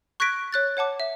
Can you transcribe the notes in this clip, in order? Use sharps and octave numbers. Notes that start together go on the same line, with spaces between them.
C#6 F#6 G#6 A#6 B6 D7
C#5 F#6 A6
C#5 F#5 A5 D6
E5